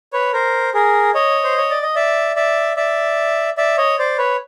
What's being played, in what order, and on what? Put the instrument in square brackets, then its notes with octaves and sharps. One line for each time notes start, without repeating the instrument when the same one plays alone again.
[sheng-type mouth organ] B4 C#5
A#4 C5
G#4 A#4
C#5 D#5
C5
C#5
D5
D#5
D5 E5
D5 E5
D5 E5
D5 E5
C#5 D#5
C5 D5
B4 C#5